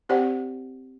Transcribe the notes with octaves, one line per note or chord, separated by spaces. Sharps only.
C4 G4 C5 D5 F#5 G5